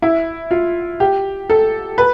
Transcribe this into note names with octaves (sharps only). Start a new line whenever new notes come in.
E4
F4
G4
A4
B4